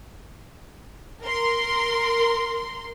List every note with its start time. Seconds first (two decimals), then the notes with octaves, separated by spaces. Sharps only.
1.23 A#4 C6